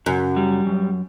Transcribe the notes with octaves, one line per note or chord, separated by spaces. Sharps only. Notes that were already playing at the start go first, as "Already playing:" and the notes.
F#2 C#3
G3
F#2